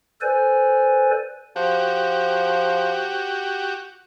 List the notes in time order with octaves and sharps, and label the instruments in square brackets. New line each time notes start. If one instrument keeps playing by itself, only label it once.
[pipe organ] A4 B4 C5 D5 G#5
[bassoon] F3 [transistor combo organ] F#4 G4